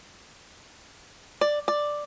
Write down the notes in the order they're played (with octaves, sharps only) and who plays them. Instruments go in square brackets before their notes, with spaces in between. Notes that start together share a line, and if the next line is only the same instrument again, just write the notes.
[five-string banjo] D5
D5